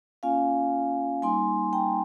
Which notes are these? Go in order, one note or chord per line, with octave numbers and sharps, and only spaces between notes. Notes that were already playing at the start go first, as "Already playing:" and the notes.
A#3 C#4 F4 F5 G#5
G3 A#3 D#4 G#5 C6
G5 A#5